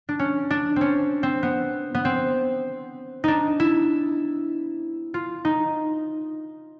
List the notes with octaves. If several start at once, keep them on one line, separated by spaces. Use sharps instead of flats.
D4
C#4
D4
C4 C#4
C4
B3
B3
C4
D4 D#4
E4
F4
D#4